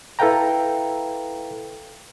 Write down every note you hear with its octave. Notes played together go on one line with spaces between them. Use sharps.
E4 A4 B4 F5 G5 A#5